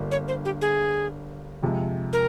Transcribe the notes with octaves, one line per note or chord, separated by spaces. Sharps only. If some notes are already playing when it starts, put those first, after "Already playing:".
Already playing: G1 G2 G3 A#3
C#5
C5
G4
G#4
F2 C3 F3 G#3
A#4